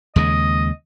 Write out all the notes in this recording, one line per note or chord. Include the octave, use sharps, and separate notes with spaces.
D#2 C#3 G#3 D#5